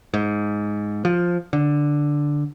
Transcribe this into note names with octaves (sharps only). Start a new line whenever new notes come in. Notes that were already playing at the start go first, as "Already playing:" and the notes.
G#2
F3
D3